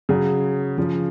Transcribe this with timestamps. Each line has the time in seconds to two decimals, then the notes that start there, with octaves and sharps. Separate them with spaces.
0.09 C#3 F#3 G#4
0.78 C#3 F3